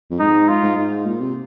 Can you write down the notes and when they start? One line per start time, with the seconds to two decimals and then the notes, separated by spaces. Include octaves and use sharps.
0.11 F2
0.19 G#2 D#4
0.48 F4
0.63 G#2
0.78 G#2
1.07 A#2
1.21 C3